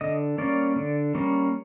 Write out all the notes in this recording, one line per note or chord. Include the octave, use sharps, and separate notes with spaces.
D3 D#5
G3 A#3 C#4 D5
D3
G3 A#3 C#4